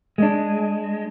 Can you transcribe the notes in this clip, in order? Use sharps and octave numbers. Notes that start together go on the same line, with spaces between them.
G#3 D4